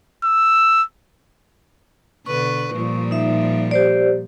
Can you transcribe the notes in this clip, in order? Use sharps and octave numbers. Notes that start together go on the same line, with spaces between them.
E6
B2 D3 B4 C#6
A#2 F3 G3
D#4 E5
G4 C5 D5